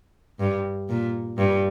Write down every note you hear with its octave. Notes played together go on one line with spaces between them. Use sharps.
G2
A#2
G2